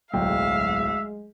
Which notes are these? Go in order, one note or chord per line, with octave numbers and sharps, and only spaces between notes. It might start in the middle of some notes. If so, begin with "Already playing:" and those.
D1 B1 G#3 E5 F5 G5